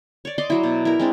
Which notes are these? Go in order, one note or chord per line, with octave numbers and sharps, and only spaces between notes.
C#5 D5
D5 D#5 C6 D6
F#3 E4
B2
E4 A#4
G#3 C4 D4